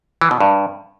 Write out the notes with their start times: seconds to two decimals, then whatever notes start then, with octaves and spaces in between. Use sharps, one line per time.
0.21 E3
0.31 B2
0.40 G2